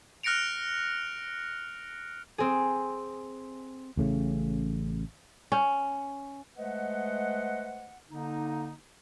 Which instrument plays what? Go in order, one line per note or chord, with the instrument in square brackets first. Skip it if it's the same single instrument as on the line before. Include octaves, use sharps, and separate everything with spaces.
[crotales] F6 F#6 A#6 C#7 D7 F7
[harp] C4 G#4
[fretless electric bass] A1 A2 C#3
[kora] C#4
[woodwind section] G#3 A3 B4 C5 D#5 F#5
D3 A#3 D#4